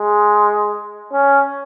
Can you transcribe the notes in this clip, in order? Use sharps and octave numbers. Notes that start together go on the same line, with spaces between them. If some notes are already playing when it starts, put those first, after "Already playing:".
Already playing: G#3
C#4